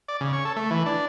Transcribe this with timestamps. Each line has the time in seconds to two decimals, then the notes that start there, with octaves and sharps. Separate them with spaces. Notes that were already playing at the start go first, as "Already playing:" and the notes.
0.08 D5
0.21 C#3
0.33 C#5
0.45 A4
0.56 A3
0.70 E3
0.86 D4